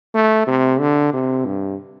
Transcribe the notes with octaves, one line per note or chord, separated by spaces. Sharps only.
A3
C3
D3
C3
G2